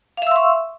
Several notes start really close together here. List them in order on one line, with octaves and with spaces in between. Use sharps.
F5 E5 E6 C6 C#6